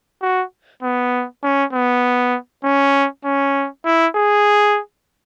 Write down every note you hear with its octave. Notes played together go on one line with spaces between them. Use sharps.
F#4
B3
C#4
B3
C#4
C#4
E4
G#4